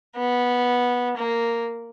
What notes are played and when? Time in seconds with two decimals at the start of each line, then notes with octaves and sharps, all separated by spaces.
0.17 B3
1.17 A#3